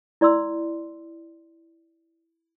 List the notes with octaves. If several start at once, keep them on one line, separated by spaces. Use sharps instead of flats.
E4 D5 C6 E6